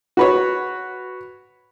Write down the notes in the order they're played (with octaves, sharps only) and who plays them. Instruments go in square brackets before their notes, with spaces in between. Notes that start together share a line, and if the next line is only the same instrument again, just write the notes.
[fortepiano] F#4 B4 C#5